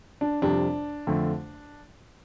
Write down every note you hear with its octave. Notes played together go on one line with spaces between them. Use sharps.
D4
F2 C3 G3 D4
F2 D3 A3